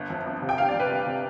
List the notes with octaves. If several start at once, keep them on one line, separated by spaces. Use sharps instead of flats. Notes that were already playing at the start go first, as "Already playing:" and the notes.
Already playing: G1
F2
G1
C3
G5
G1 F5
D5
F2
B4
G1
C3